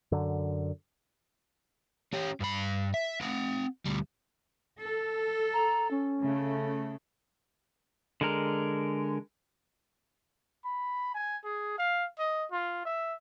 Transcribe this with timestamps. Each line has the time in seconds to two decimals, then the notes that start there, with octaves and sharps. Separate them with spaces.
0.12 F#2 D3
2.13 C#4 G4
2.40 G2 B5
2.94 E5
3.21 C4 F#5
3.86 D2 G3
4.79 A4
5.54 A#5
5.91 C#4
6.21 C#3 A3
8.21 D3 G#3 A#4
10.65 B5
11.14 G#5
11.45 G#4
11.78 F5
12.19 D#5
12.52 F4
12.85 E5